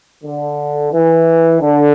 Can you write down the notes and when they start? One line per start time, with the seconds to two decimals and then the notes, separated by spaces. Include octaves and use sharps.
0.24 D3
0.92 E3
1.60 D3